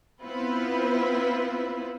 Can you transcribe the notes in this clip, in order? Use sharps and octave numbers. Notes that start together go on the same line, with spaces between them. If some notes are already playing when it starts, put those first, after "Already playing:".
B3 C4 E4 F4 B4 C5